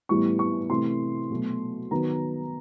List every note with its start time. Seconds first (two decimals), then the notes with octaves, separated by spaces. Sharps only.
0.09 A2 E3 G3 B3 C#6
0.39 C#6
0.70 C3 E3 A3 C6
1.31 B2 F#3 A3
1.91 D#3 F#3 B3 A#5